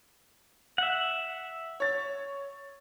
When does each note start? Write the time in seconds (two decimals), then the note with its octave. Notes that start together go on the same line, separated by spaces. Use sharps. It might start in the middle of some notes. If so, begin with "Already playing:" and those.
0.78 E5 F#5
1.80 C#5 A6